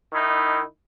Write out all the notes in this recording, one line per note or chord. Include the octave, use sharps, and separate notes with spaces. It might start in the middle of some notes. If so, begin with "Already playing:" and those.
D#3 D#4 E4